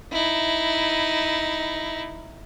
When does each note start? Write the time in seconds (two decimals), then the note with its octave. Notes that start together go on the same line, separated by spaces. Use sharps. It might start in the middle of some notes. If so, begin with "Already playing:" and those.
0.12 D#4 E4